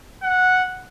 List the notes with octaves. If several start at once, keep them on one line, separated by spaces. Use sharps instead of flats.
F#5